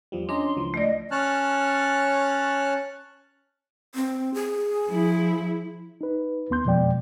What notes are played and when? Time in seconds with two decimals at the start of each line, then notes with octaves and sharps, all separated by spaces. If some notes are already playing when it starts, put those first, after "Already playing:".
0.12 E2 F3 G3
0.29 C#4 D4 D#5 A#5 C6
0.57 C#2 E3 F3
0.74 A3 D5 D#5
1.11 C#4 C#5 A5 F6 F#6
3.95 C4
4.34 G#4
4.89 F3 E4
6.01 D#4 B4
6.50 D#2 B3 C6 G6
6.65 F2 B2 F3 G#3 D5 G5